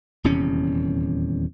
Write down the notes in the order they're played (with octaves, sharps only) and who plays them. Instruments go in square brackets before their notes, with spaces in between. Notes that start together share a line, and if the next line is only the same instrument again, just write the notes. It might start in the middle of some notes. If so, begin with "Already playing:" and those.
[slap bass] D#1 E2 C3 C#4